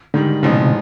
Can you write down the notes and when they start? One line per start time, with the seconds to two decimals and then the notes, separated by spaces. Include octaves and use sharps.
0.14 G#2 D3 D#3 G3
0.43 A1 G#2 C#3 F3
0.50 B2
0.57 C3